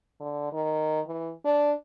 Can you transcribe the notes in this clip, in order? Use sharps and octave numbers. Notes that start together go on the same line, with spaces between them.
D3
D#3
E3
D4